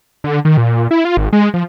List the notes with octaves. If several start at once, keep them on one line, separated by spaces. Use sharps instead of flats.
D3
D#3
A#2
E4
F4
G#1
G#3
F3